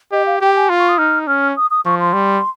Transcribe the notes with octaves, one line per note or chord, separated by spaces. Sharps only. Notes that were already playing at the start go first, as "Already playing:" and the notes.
G4 D#5
F5
G4 G5
G#5
F4 C6
C#6
D#6
D#4 F6
C#4 F6
D#6
D#6
F3 C#6
C6
G3